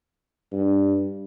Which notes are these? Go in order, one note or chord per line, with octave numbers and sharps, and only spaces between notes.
G2